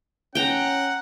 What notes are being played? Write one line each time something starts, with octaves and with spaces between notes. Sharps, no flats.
C#4 F#5 G5 A#5